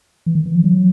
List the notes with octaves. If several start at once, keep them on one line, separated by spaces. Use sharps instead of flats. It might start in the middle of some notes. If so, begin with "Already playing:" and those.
E3
D#3
E3
F3
F#3